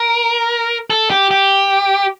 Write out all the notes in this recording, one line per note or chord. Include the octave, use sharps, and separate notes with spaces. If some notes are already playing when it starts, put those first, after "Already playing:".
Already playing: A#4
A4
G4
G4